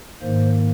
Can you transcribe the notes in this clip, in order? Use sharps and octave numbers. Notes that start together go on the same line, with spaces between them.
G#2 D#3 A#3 C5